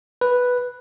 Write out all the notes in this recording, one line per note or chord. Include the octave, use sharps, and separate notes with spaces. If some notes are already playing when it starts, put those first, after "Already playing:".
B4